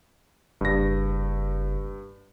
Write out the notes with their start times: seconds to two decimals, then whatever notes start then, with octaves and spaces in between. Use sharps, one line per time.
0.61 F#1 G2 A#6